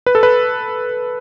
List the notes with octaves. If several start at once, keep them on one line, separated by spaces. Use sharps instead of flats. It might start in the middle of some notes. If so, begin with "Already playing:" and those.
B4
A4
B4